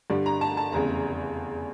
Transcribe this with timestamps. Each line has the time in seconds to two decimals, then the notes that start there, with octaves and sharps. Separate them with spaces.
0.10 G2 D3 G3 D5
0.26 A#5
0.41 A5
0.57 A5
0.72 F1 E2 C#3 A#5